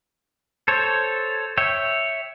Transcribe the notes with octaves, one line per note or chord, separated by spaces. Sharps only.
A4 C5 C#5
C#5 E5 G5